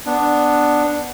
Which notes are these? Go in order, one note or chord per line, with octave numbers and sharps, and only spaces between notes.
B3 D4